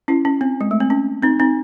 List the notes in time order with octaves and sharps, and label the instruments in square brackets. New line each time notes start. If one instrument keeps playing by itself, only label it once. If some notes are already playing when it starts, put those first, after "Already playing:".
[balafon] C#4 E4
C#4
C4
G#3
A3
C4
C#4
C4 D#4
C4 D#4